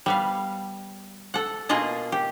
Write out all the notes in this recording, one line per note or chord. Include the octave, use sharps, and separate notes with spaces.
G3 B3 F5
A4 F#5
B2 A#3 F4 G#4 D#5 A5
G4